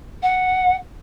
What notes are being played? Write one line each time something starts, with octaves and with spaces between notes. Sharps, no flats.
F#5